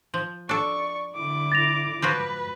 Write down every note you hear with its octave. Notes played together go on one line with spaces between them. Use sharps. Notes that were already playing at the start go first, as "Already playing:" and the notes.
F3
D4 A4 D5 C#6
D3 E4 D6
A6 A#6 F7
F3 F4 F#4 B4